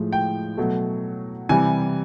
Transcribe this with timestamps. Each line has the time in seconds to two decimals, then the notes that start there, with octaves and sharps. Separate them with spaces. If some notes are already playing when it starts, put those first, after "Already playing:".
Already playing: A2 F3 G#3
0.12 G5
0.57 B2 F#3 A3
1.49 C3 E3 G3 G#5